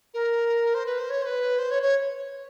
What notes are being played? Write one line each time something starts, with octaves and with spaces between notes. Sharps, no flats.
A#4
C5
B4
C5
C#5
C5
B4
C5
C#5
C#5